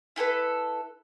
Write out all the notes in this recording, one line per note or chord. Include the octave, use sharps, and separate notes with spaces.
E4 G4 A4 B4